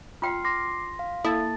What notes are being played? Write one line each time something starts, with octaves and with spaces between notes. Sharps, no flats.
F4 G5 C6 F6 C7
C6 D6 A#6 C7
F5
A#3 E4 A4 A5 A6